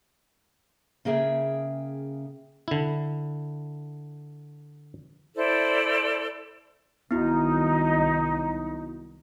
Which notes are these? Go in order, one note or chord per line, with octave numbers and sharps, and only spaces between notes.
C#3 A#3 G#4 E5 G5
D3 E4
E4 A4 C5 D5
C2 D#3 F#3 B3 D#4 E4 F#4